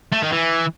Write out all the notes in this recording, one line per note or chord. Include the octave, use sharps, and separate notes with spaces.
A3
D#3
E3